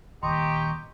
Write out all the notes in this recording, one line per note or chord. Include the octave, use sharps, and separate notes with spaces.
D#1 G4 D#5 A#5 C6 C#6